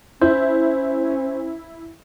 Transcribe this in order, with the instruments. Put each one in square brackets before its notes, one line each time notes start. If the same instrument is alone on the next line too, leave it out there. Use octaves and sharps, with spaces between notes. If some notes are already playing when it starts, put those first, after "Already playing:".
[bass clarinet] C#4 [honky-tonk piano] E4 [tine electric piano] C5